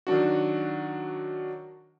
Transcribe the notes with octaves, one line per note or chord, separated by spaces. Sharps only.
D#3 F#3 D4 F#4